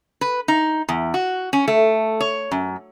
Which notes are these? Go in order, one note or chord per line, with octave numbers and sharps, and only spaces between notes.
B4
D#4
E2
F#4
C#4
A3
C#5
F#2